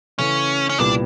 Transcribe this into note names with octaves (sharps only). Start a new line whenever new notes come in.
C#3 E3 A3 C#4
C#4
C2 A#2 G3 B3 D4